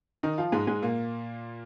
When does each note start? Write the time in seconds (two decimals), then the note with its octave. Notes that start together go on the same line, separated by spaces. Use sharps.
0.23 D#3 D#4
0.38 F3 F4
0.52 G#2 G#3
0.67 G#2 G#3
0.82 A#2 A#3